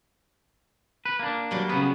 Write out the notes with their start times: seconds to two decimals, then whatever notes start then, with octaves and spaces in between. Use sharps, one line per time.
1.05 B4
1.19 A#3 D4
1.51 F#3 G3
1.69 C#3 B3 B4